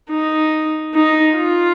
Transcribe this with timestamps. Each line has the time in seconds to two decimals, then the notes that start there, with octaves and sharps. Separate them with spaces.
0.11 D#4
0.94 D#4
1.36 F4